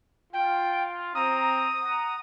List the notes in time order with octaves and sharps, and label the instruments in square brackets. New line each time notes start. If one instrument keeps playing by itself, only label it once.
[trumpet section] F4 [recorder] G5
[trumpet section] C4 A#5 [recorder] D#6
[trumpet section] F#5 A#5